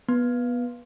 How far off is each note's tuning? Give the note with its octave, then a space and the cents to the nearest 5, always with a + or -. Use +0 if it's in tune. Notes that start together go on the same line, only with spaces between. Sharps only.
B3 -15